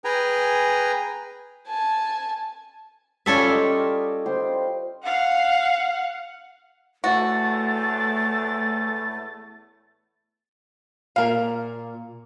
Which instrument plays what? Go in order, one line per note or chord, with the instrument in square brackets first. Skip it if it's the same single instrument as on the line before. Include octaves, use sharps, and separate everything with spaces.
[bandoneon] G#4 B4 G5 G#5 A#5
[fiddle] G#5 A5
[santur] G3 F4 D#6 [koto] C#4 A4 E5
[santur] D5 D#5 G5
C5 G5 C6
[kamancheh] F5 F#5
[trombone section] E2 A2 [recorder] A3 [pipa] F#4 [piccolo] A6
[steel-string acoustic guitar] A#2 [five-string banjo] A#4 F5